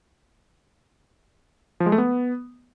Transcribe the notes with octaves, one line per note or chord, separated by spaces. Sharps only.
F3
G#3
A3
B3